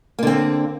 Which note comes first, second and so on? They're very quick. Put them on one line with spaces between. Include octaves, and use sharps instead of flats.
A#3 D3 C4